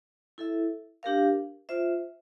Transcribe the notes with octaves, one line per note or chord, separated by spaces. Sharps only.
E4 A4 E5
D4 G4 A#4 F5
F4 C5 E5